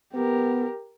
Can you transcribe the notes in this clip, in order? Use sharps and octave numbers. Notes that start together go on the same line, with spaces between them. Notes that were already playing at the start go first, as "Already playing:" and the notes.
B3 G4 A#4